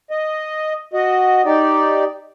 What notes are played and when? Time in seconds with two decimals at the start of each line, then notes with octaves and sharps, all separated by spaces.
0.11 D#5
0.94 F#4 D#5
1.45 D#4 G4 D5